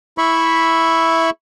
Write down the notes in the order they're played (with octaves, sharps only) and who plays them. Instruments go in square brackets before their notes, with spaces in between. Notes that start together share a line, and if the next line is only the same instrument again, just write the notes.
[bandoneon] E4 E5 B5 C#6